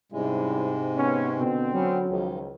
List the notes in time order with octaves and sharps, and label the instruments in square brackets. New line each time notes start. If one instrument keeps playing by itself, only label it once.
[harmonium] G#2 C3 G#3 [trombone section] G3 C#4 E4
[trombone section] B3 C#4
[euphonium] B2 [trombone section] D3 C4
[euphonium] F#3 [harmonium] B3 C#4
[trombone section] C#2 [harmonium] D#3 F3